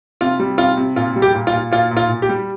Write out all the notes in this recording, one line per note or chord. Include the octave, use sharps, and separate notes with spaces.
C3 F4
G3
C3 F4
C3
A#2 F4
G3
G4
A#2
F4
A#2
A#2 F4
A#2
F4
A#2
G4
G3